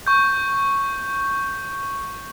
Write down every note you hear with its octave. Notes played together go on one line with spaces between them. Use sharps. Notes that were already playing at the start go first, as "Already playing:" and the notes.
C#6 G6